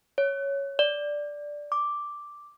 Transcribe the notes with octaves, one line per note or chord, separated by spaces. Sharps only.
C#5
D5
D6